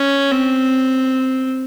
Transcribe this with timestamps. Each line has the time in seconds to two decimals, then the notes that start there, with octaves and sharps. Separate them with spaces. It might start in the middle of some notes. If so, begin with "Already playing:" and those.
Already playing: C#4
0.31 C4